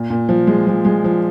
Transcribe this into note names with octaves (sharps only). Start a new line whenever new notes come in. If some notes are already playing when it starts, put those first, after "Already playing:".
Already playing: A#2
A#2
F3
G#3
F3
G#3
F3